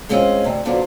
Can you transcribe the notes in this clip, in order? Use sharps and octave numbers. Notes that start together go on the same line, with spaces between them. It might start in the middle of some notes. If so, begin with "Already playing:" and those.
G#3 C4 C#4 F4 D#5
D2 C3
D3 F#3 B3 D4 F4 C5